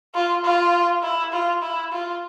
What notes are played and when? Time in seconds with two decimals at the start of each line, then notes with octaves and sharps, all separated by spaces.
0.15 F4
0.44 F4
1.03 E4
1.33 F4
1.62 E4
1.92 F4